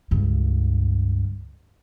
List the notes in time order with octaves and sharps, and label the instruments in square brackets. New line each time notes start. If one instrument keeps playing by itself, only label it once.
[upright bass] C#2 G2